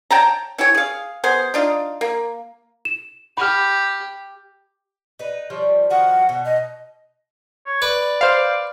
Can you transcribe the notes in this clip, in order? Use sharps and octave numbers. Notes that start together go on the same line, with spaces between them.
C#5 G5 A5 A#5
C#4 E4 G4 C#5
G#4 F5
B3 G#4 C5
D4 D#4 F4
A#3
E7
G4 B5 F6
D#4 B4
F3 G3 C#5
D#3 F3 F#4 F#5
B2
D#5
C#5
B4 D5
C5 F5